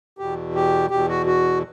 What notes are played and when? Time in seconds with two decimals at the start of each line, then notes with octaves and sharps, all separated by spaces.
0.18 E2 B2 G4
0.55 G4
0.90 E2 B2 G4
1.09 F#4
1.26 F#4